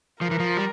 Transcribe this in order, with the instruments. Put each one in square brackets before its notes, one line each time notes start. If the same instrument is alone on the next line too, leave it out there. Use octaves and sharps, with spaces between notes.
[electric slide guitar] F3 [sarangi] A#4
[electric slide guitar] E3
F3
G3